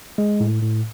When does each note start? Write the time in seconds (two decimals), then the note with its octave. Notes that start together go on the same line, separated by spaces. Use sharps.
0.18 G#3
0.40 A2
0.62 A2